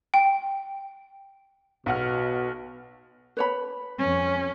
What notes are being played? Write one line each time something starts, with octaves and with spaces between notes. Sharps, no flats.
G5
B1 B2 F#5 F6
B4 C#5 B5
F2 C#4